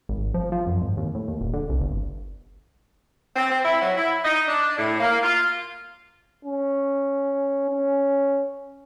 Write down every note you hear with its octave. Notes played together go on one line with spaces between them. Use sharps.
G#1
F3
F3
F#2
G#1
D#2
A2
D#2
D#1
D3
C2
G1
C4
C4
E4
F#3
E4
D#4
D4
A2
A#3
F4
C#4
C#4